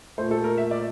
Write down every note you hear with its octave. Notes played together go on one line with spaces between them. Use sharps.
A#2 A3 C5
A4
A#4
E5
D5